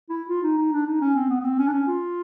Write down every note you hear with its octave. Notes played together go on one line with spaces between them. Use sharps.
E4
F4
D#4
D#4
D4
D#4
C#4
C4
B3
B3
C4
C#4
D4
C#4
F4